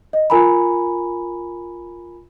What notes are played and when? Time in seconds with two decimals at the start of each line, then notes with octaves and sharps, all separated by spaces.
0.13 D#5
0.30 F4 A#4 G#5 A#5 B5